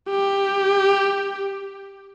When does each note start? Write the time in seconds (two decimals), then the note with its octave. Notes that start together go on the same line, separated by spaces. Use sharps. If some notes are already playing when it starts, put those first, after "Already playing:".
0.11 G4